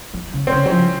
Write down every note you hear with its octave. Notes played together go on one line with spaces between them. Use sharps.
F3
C#3
C4
C#3 C#4
F#3
F3